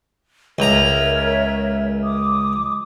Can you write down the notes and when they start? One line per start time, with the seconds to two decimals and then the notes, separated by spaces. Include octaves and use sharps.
0.59 C#2 A#4 C#5 E5 A#5
2.03 D6 D#6